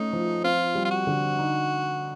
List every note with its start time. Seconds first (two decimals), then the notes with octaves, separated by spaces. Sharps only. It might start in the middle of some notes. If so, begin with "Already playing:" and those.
Already playing: A3 C#4 D#4
0.13 F3
0.44 C4 F4
0.75 G3
0.85 F4
0.91 F#4
1.07 D3
1.38 D#4